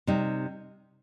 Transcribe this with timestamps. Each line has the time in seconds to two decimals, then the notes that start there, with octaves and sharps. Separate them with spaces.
0.07 C3 G3 D#4